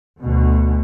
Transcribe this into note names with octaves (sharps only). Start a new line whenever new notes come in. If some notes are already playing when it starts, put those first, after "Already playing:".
D2 B2